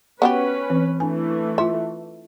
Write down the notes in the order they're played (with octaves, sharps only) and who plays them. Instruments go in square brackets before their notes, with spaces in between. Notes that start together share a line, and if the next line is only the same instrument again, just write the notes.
[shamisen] B3 F#4 G4 [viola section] C#4 B4 [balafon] B5
[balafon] E3 C4
[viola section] E3 A3 [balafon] D4 G#5
[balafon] F4 C6 [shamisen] E5